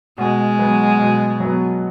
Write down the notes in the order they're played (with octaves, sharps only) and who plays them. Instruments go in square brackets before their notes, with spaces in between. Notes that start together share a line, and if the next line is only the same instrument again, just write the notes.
[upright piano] B2 [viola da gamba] G#3
[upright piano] F#3 B3
B2
F#3 B3